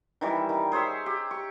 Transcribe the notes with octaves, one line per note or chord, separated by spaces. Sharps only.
D#3 E3 G3
D#3
G#4 C5 C#5 E5
G4
C#6